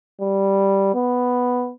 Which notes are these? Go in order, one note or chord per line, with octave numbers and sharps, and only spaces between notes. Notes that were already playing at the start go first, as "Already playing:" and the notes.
G3
B3